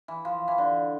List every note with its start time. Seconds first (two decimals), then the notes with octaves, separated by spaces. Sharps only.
0.08 E3
0.25 F3
0.48 E3
0.58 D3